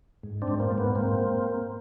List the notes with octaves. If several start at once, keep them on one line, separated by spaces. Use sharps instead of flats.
G#2
C4 D4
G#2
A#3 C4
G#2
B3
G#2 A#3 C4